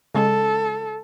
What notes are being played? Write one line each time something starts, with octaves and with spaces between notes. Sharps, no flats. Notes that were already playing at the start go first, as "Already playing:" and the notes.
C#3 G#3 A4